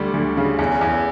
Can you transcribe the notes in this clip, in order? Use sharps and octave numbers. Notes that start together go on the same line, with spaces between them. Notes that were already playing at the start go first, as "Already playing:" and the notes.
Already playing: D2 G3 A4
D2
C#3
E2
E2